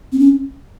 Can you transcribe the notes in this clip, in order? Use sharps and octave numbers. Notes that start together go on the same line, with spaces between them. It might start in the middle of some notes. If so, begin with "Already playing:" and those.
C4
C#4